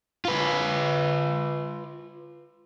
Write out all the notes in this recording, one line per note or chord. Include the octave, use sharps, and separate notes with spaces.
F4 B4